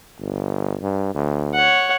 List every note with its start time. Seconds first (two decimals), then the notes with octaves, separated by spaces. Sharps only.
0.19 G1
0.82 G2
1.14 D2
1.54 C#5 F#5